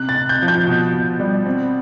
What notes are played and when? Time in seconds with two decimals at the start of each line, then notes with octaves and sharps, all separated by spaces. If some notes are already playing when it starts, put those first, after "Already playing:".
Already playing: C3 F#6
0.09 A6
0.16 C3
0.29 G6
0.42 F3
0.48 G6
0.67 B2
0.94 B2
1.20 G3
1.45 C4